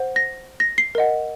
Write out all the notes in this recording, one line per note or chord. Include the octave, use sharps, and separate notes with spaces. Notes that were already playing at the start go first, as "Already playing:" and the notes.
Already playing: C5 F#5
A#6
A#6
C7
A#4 D#5 F#5